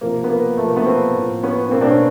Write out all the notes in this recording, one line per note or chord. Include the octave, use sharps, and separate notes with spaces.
C3 F3 A#3
B3
A#3
C3 F3 A3
A#3
A3 B3
A#3 C4
A2 F3
B3 C#4
B3
B2 A#3 C4
C4 D4
B3 C#4